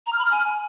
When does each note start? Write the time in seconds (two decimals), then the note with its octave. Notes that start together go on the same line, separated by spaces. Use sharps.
0.07 A#5
0.13 F6
0.19 B5
0.25 F6
0.31 G#5